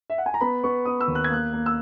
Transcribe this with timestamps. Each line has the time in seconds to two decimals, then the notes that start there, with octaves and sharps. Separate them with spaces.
0.10 E5
0.18 F#5
0.26 G#5
0.34 A#5
0.41 B3 B5
0.64 B3 C#6
0.85 B3 D#6
1.01 E6
1.08 D#2
1.15 F#6
1.24 G#6
1.30 A#3 F#6
1.53 A#3
1.66 E6